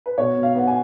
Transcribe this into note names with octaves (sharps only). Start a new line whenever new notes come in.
B4
B2 C#5
B2
F5
B3 F#5
G#5